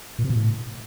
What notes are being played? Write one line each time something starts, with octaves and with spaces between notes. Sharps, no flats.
A#2
C3
B2
A2